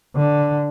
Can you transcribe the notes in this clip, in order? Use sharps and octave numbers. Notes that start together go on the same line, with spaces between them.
D3